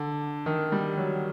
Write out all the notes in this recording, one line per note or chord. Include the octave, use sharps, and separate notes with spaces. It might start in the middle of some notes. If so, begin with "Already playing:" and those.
Already playing: D3
D#3
G3
F#3